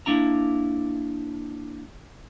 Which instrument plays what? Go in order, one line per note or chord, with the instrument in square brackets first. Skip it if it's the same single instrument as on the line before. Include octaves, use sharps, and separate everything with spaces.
[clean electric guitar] A#3 D4 E4 A#5